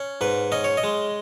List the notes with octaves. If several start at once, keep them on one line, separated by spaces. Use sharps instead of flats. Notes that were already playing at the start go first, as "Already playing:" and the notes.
Already playing: C#4
G#2 B4
C#4 D#5
C#5
D#5
G#3